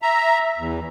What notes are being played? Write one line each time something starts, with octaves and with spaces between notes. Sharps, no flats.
E5 A#5
E2